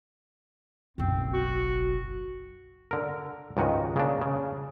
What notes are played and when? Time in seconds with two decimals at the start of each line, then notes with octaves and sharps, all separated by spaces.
0.98 F#1 B1 C4
1.33 F#4
2.91 D3 A#4
3.57 C#2 G#2 D#3 F#4 D#5
3.96 C#3 A#3 D4
4.21 C#3